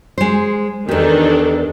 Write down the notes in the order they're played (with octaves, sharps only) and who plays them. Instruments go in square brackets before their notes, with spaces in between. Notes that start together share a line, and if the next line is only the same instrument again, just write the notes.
[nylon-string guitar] G#3 C5
[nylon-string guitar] E2 G4 [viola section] D#3 D4 A4